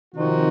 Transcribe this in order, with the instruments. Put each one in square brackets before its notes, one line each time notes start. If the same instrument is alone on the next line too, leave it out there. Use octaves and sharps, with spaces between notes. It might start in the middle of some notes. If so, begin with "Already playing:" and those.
[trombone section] C3 D#3 [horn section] F3 C4 D#4 F#4